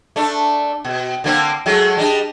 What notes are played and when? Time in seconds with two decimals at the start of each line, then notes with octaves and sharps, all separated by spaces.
0.16 A3 D4
0.85 B2
1.24 D3 A#3 C4
1.66 F#3 G#3 A3
1.97 G3 D4 D#5